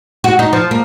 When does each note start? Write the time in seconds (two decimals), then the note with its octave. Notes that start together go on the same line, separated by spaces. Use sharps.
0.24 F#4
0.39 D#4
0.53 F3
0.71 A#3